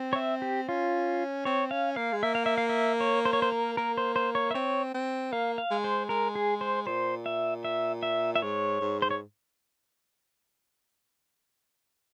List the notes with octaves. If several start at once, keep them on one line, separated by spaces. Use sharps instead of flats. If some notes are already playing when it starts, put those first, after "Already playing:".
Already playing: C4
C#5
E5
G4
C#4 F4
C4 C#5
C#4 F5
A#3 F5
G#3
A#3 E5
F5
E5
F5
E5
C#5
C5
C#5
C5
A#4
A#3 A#4
C5
C5
C#5
E5
C4 C#5
C4
A#3 F5
F5
G#3
C5
G#3 A#4
G#4
C5
A#2 C5
E5
E5
E5
E5
G#2 C#5
G#2
C5
C#5